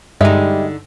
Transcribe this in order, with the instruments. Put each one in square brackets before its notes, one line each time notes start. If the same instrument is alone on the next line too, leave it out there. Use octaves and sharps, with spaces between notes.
[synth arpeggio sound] G2 [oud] D3 D#4 [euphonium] G3 [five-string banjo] G#3 E5